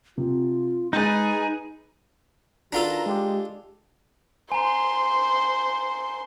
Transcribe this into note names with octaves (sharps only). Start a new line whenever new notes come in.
C3 F4
G#3 D#4 G#4 B4 G6 A6
D#3 D4 F4 F#4 A4 B4 A#5
G#3 G4
C5 G#5 A#5 C6